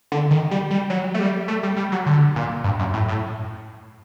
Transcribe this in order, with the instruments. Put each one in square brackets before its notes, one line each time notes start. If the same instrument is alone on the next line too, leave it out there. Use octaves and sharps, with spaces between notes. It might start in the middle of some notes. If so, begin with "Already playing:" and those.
[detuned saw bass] D3
D#3
G3
G3
F#3
A3
G3
A3
G3
G3
F#3
D3
A#2
G2
F#2
A2
A2